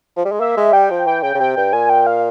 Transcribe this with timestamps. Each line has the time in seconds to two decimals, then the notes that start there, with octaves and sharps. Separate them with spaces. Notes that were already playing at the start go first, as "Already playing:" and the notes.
0.17 F3
0.25 G3
0.32 G#3
0.40 A#3 E5
0.57 G#3
0.73 G3 G5
0.90 F3
1.07 E3 G5
1.23 C#3 G5
1.35 C#3
1.40 C3 G5
1.56 G2 G5
1.73 A#2 G#5
1.90 G5
2.07 F5